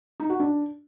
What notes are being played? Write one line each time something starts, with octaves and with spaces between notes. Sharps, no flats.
D#4
F#4
D4